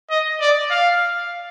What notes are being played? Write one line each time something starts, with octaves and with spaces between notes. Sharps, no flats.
D#5
D5
F5